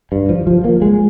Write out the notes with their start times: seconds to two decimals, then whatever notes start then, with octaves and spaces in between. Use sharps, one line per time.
0.12 G2
0.29 F3
0.47 F3
0.64 A#3
0.82 G#3